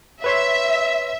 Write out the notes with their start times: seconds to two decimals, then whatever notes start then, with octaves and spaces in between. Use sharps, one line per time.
0.24 B4 C#5 E5 C6